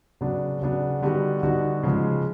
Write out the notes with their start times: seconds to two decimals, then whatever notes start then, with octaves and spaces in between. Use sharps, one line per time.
0.21 C#3 F#3 B3 D4
0.62 C#3 F#3 B3 D4
1.02 D3 G3 B3 D#4 F#4
1.43 D3 G3 B3 D#4 F#4
1.83 C#3 F3 G#3